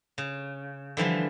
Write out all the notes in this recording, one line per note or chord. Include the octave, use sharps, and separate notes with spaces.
C#3
D3 E3 F3 G3